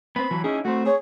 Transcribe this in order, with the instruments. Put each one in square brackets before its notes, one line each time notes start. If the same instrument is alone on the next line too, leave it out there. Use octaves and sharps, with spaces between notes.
[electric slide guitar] B3 C4 [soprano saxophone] B5
[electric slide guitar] E3 F#3
[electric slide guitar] C#4 D#4 E4 [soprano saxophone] G#4
[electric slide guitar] A3 C4 [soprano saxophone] F#4
[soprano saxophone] G#4 [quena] C#5